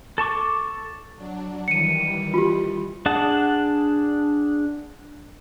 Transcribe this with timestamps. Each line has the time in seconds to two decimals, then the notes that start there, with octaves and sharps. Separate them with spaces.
0.18 A4 A5 C#6 D6
1.16 F#3 D4
1.68 D#3 E3 G3 C#7 D#7
2.34 F4 G4
3.06 D4 G#4 F#5 A5